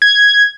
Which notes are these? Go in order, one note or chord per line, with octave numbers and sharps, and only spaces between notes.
G#6